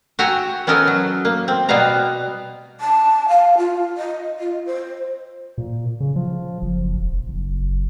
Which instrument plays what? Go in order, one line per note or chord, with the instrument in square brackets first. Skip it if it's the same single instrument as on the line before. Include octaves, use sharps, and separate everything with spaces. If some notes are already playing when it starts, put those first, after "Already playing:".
[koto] F#4 E5 G5 G#5 A#5
B3 C#4 A4 A#4 D#5 G#5
F#3
A#3
C4
B2 G3 B3 F5 A#5
[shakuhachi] A5
F5
F4
D#5
F4
C5
[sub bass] A#2
C#3
F3
F#1
D#1
F#1